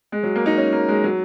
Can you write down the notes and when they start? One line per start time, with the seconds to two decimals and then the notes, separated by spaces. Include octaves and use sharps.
0.12 G#3
0.23 F#3
0.35 A#3
0.46 D#4
0.58 C#4
0.73 A#3
0.88 G#3
1.04 F#3